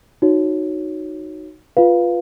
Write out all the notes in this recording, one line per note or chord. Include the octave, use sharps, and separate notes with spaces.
D#4 F#4 C#5
F4 B4 F5